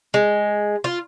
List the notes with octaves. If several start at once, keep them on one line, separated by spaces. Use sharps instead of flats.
G#3
F4